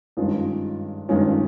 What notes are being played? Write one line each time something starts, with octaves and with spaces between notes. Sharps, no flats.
G2 D#3 G#3 C#4 F4
G2 D#3 G#3 C#4 F4